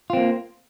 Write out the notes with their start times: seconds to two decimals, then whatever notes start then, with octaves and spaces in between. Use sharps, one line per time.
0.10 F4
0.13 C4
0.17 A#3